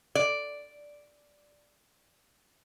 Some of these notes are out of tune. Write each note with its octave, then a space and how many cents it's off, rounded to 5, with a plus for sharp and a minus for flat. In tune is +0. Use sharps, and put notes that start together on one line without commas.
D5 -5